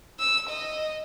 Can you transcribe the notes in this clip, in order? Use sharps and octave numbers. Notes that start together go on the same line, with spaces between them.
E6
D#5